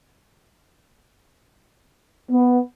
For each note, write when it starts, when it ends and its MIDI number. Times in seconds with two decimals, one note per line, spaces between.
2.30 2.58 59